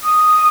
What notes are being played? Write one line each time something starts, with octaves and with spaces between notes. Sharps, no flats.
D#6